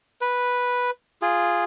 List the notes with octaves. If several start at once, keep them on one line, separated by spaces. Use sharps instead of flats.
B4
F4 G#4